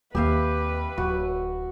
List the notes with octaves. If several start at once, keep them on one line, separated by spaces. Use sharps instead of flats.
D#2 C4 G4 B4 E5 F5
D1 F#4